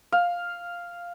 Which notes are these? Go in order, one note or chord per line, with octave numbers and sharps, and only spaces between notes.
F5